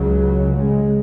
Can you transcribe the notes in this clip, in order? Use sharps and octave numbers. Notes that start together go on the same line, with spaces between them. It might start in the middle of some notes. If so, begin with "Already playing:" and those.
Already playing: C#2 C#3 F#3
G#3